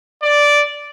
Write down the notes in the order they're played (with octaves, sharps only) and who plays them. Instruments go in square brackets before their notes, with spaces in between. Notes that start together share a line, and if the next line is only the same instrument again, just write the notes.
[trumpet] D5